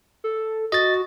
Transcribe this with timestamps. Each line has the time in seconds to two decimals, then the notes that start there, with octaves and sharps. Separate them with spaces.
0.24 A4
0.72 F#4 D#5 A6